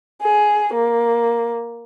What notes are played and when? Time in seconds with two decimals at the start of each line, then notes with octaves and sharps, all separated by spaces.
0.22 G#4
0.74 A#3